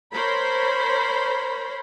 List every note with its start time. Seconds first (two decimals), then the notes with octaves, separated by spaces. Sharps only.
0.14 A#4 C5 C#5 B5